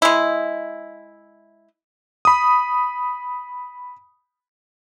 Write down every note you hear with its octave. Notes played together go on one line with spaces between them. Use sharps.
G#3 E4
B5 D#6